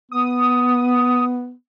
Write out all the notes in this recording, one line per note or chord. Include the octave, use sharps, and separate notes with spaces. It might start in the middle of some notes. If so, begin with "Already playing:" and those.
B3 D#6